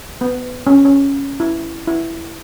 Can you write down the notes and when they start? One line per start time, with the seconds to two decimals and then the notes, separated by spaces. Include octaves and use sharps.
0.21 B3
0.67 C#4
0.85 C#4
1.40 E4
1.87 E4